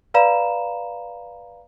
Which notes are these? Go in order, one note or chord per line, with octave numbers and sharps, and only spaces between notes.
B4 D5 F5 A#5 B5 E7